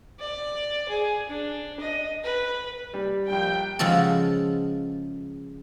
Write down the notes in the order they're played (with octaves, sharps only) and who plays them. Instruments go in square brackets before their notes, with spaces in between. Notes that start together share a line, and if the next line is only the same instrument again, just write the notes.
[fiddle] D5
G#4
D4
D#5
B4
[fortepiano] G3
[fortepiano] A#1 G3 [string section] G5
[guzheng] C#3 F3 G#3 F#4 A4